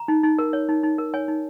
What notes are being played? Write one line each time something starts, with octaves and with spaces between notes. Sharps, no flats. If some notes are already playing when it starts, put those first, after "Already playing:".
Already playing: A#5
D#4
D#4
A#4
C#5
D#4
D#4
A#4
C#5 G#5
D#4